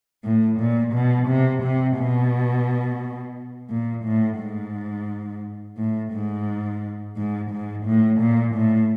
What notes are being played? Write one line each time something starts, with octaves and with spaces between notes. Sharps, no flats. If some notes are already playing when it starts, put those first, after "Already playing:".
A2
A#2
B2
C3
C3
B2
A#2
A2
G#2
A2
G#2
G#2
G#2
A2
A#2
A2